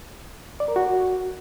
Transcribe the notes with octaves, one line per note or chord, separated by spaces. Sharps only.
D5
A#4
F#4